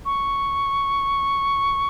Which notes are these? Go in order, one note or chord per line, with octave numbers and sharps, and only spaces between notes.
C#6